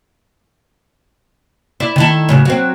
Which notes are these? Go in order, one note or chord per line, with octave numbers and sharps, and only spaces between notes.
E4 D5
D#3 E4 A4
A2 C#3 F#3
F#3 C4